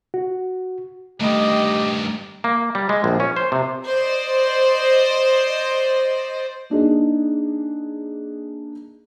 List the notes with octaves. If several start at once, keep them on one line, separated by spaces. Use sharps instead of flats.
F#4
G2 D#3 A3 G4 D#5 B5
A#3
G3
G#3
A#1
C#4
C5
C3
C5 D5 D#5
A#3 D4 D#4 G#4